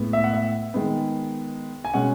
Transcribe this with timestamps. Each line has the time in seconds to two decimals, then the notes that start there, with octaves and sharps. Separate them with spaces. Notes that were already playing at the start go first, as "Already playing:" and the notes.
Already playing: A2 G#3 B3
0.13 E5
0.24 F#5
0.33 E5
0.74 D#3 G#3 B3
1.85 G#5
1.94 B2 G#3 C#4 F#5